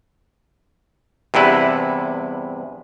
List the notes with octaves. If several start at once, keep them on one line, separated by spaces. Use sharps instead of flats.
E2 G2 C3 E4 B4